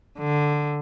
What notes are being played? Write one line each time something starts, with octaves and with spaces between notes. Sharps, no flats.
D3